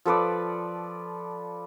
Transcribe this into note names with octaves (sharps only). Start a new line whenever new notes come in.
F3 A4 B4 D5